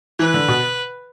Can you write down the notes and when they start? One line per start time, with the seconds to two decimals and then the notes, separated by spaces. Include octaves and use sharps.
0.19 E3 B4
0.34 D3
0.48 B2